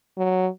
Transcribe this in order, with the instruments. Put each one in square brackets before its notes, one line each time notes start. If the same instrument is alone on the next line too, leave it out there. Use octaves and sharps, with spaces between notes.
[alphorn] F#3